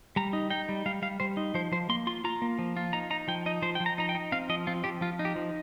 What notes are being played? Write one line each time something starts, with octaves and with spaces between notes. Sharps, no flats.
G3 A#5
D#4
D#4 G5
G3
G3 F5
G3 F5
G3 C5
D#4
F3 C5
F3 C5
A#3 C6
F4 C6
F4 A#5
A#3
F3
F4
D#4 A#5
D#4 A#5
F3 G5
D#4 D#5
F3 C5
F3 G5
A#5
D#4 A#5
G5
D#4
C4 F5
F3 D#5
C4 F4
F3 G4
F3 F4
D#4
G4
F3